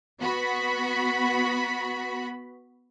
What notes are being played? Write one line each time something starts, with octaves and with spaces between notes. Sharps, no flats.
B3 F#4 B5